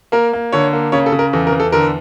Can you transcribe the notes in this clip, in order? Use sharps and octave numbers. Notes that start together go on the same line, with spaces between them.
A#3 A#4
A#3
D3 C#5
A#3
C#3 C#5
A4
C#3
A#4
E2 A4
A#4
E2
A4
D3 A#4